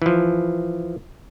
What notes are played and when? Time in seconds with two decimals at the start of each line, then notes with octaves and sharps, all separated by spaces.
0.02 E3 F3